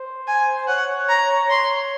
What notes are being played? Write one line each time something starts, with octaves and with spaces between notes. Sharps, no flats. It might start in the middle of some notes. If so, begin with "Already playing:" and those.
Already playing: C5
G#5
C#5 F#5
A#5
C#5 C6